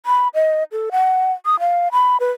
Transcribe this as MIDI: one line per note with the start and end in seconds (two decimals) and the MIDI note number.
0.06 0.28 83
0.34 0.64 75
0.72 0.90 69
0.92 1.32 78
1.46 1.59 87
1.60 1.88 77
1.92 2.17 83
2.20 2.31 71